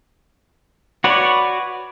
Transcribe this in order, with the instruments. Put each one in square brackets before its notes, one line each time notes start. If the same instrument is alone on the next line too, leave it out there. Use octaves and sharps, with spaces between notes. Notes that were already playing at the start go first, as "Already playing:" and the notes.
[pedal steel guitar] F#4 B4 C#5 D5